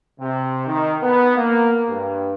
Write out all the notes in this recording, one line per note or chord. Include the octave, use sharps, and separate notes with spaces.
C3
D#3
B3
A#3
G2